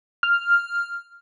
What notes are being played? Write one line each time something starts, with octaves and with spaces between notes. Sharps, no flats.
F6